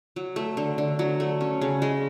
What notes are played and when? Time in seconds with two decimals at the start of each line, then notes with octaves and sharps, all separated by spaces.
0.16 F#3
0.36 A3
0.57 D3
0.78 D3
0.99 F#3
1.20 A3
1.41 C#4
1.61 C#3
1.82 G#3